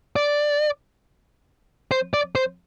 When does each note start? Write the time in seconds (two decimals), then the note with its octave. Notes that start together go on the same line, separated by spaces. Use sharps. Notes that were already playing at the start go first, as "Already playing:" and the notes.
0.16 D5
1.91 C5
2.14 D5
2.35 C5